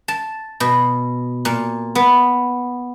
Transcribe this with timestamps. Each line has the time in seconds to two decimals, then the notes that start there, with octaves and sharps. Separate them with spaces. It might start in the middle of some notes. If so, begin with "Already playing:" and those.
0.08 A5
0.60 B2
1.45 A#2
1.95 B3